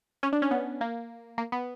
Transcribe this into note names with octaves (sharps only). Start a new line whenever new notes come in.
C#4
D4
C#4
B3
A#3
A#3
B3